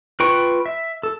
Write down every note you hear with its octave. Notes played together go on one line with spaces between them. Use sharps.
F4 B4 G5 C#6
E5
A4